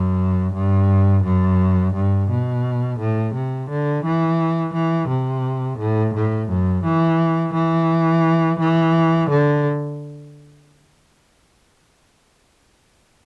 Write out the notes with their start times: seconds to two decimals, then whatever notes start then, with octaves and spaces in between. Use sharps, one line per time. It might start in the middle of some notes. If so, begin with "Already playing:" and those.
Already playing: F#2
0.53 G2
1.23 F#2
1.94 G2
2.29 B2
2.99 A2
3.34 C3
3.70 D3
4.05 E3
4.73 E3
5.09 C3
5.79 A2
6.14 A2
6.49 F#2
6.85 E3
7.54 E3
8.59 E3
9.29 D3